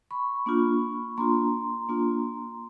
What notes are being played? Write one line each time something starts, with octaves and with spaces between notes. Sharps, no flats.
B5 C#6
A#3 D4 F4
A#3 D4 F4 A#5 C6
A#3 D4 F4